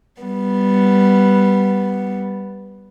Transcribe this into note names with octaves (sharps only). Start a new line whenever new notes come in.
G3 B3